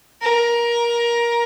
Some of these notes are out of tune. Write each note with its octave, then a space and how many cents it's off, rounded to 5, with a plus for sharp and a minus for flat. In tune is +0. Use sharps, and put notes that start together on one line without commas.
A#4 +20